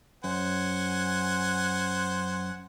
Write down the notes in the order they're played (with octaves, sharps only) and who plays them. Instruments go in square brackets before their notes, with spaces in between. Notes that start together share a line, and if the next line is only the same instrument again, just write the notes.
[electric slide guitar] F#2 [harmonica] C5 F#5 G#5